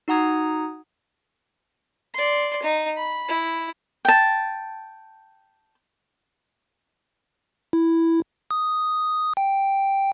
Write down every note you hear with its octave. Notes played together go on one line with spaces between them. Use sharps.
D#4 F#4 F#5 A#5 D#6 G#6
D5 C6
D#4
B5
E4
G5 A5
E4
D#6
G5